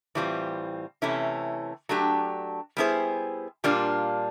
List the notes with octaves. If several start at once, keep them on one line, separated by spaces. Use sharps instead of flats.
A2 E3 G3 C4 F4
C3 E3 A3 C#4 E4
F#3 A3 D4 G4
G3 B3 E4 G#4 C5
A#2 G3 A#3 D4 F4